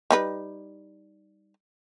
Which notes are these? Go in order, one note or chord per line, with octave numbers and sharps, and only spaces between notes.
G3 D#4 B4